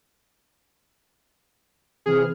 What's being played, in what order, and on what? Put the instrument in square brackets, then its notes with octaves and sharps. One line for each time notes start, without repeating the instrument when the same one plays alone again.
[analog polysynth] C3 E3 F6 [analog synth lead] G#4